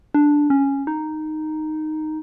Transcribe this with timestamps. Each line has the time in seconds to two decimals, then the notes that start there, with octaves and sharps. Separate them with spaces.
0.14 D4
0.50 C#4
0.87 D#4